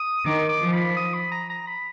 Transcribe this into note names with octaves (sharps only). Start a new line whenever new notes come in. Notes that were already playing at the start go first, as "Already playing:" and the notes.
Already playing: D#6
D#3 D6
D6
F3
B5
D#6
B5
A#5
A#5
B5